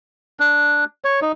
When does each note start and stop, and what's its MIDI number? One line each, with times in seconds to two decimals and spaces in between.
0.40 0.85 62
1.04 1.20 73
1.22 1.32 63